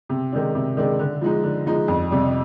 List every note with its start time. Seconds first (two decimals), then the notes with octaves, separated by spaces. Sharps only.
0.09 C3
0.32 D#3 G#3 D4
0.55 C3
0.77 D#3 G#3 D4
0.99 D3
1.21 F3 G#3 D#4
1.44 D3
1.66 F3 G#3 D#4
1.88 F2
2.11 C3 G3